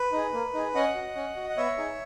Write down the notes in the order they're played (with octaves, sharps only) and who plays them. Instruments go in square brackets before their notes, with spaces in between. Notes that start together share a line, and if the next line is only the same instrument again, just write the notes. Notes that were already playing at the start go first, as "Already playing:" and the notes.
Already playing: [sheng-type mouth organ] B4
D#4 G#4
A#3
D#4 G#4
C#4 D#5 F#5
F#4
C#4
F#4
F#5
B3 C#5 E5
D#4 G#4